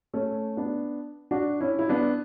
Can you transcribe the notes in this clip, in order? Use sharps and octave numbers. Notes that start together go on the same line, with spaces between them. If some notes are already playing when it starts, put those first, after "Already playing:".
A3 C#4
B3 D4
D4 F#4
C#4 E4
E4
B3 D4